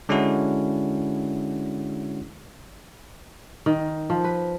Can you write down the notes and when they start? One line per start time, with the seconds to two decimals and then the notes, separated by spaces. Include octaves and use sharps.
0.09 D3 G#3 C#4 D4 E4 F#4
3.66 D#3
4.10 F3
4.24 B4